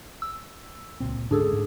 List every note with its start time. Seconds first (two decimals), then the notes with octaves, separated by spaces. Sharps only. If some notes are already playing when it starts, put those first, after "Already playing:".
0.22 E6
1.00 C#2 A#2 C4
1.31 G#2 D3 C#4 D4 G#4 A4
1.51 G#2 A3